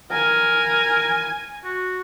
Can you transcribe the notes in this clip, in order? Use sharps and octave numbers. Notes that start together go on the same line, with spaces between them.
A#4 G#5
F#4